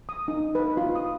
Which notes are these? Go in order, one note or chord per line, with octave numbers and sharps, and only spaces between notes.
D#6
D#4
B4
F4
D#6